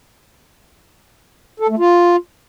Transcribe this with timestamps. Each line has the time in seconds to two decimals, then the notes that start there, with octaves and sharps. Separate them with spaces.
1.60 A4
1.69 A3
1.79 F4